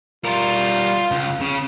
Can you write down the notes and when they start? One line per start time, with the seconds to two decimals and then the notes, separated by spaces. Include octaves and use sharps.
0.25 G3 F4 A#4
1.11 C#2
1.40 C#3